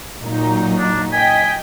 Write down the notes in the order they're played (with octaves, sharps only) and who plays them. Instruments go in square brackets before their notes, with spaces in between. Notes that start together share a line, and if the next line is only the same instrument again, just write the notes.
[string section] A#2 F#3 D#4
[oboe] D4
[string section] D#5 G5 B6 [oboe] G#5